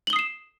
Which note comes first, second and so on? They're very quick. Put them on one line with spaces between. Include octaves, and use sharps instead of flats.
F#7 G7 D#6 C7 E7